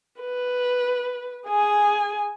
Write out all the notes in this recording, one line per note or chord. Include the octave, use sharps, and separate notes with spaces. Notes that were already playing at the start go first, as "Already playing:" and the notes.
B4
G#4 G#5